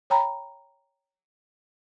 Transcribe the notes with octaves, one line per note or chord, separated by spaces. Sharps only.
C#5 G5 A#5 B5